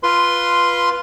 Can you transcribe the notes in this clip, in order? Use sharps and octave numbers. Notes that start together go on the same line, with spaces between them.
F4 B4 C6